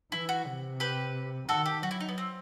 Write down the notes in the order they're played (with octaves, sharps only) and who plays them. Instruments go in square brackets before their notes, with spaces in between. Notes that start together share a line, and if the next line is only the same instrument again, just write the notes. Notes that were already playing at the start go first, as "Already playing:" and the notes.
[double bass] E3 [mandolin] E4
[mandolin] F#4
[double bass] C3
[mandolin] G4 B4
[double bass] D#3 [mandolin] F#4 A4
[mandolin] G4
[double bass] F#3 [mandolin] F#4
[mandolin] E4
D#4
B3
C4